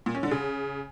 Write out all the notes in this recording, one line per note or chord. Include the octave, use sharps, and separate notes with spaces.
A#2
C#4
D3
C#3